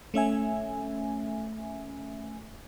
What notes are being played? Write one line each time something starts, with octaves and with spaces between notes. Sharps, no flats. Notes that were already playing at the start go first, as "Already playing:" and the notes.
A3 C#4 E5 G#5